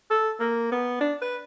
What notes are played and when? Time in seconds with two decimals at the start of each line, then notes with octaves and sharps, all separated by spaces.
0.10 A4
0.40 A#3
0.72 B3
1.01 D4
1.22 B4